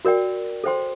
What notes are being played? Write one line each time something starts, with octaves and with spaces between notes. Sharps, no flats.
F#4 A#4 D5 G5
A4 C5 G5 C6